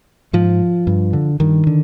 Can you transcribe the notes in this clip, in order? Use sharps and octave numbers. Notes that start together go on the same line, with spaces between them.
G#2 F3
G2
D3
G2 D#3
D3